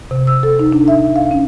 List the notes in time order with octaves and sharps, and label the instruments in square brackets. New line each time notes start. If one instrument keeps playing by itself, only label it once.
[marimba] C3
E6
A4
D#4
D4
E5
F5
C#4